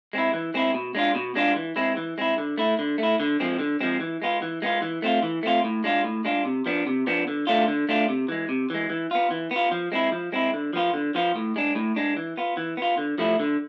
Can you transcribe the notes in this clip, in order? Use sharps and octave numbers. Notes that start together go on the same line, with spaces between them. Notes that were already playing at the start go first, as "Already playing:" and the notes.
G#3 C4 E4
E3
G#3 C4 E4
B2
G#3 D4 F4
B2
G#3 D4 F4
E3
G#3 C4 E4
E3
G#3 C4 E4
D3
A3 E4
D3
A3 E4
D3
F3 G#3 C4
D3
F3 G#3 C4
E3
G#3 B3 F4
E3
G#3 B3 F4
E3
A3 C4 F4
E3
A3 C4 F4
A2
G#3 D4 F4
A2
G#3 D4 F4
C3
F3 B3 D4
C3
F3 B3 D4
D3
A3 D4 F4
D3
A3 D4 F4
C3
E3 G#3
C3
E3 G#3
E3
B3 F4
E3
B3 F4
F3
G#3 C4 E4
F3
G#3 C4 E4
D3
F3 B3 F4
D3
F3 B3 F4
A2
G#3 D4
A2
G#3 D4
E3
B3 F4
E3
B3 F4
D3
F3 A3 E4
D3